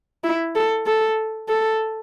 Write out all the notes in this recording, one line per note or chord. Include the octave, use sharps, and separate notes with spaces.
E4
A4
A4
A4